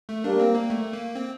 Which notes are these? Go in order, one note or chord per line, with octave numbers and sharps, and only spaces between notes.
A3
G3 A#3 D4
C4
A#3
A3
A#3
C4